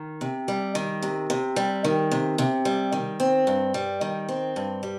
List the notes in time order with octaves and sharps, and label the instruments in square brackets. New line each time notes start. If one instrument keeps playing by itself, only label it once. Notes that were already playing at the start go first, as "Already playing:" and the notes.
Already playing: [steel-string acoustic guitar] D#3
C3
G3
D#3
C3
C3
G3
D#3
C3
C3
G3
D#3
C4
G2
G3
D#3
C4
G2
G3